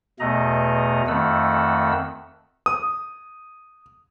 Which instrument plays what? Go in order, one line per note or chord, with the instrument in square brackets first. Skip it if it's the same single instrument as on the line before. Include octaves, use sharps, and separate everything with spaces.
[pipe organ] E2 B2 A3 D#5 A#5
F2 D#3 A3 F#5 E6
[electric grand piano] D#6